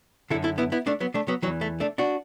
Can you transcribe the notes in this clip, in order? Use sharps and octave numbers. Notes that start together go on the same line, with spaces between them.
F#2 D3 E4 A4
E4 A4
B3 E4
B3 E4
A3 D4
F#3 B3
A3 D4
F#3 B3
E2 E3 F#3
A3
A3 D4
D4 F#4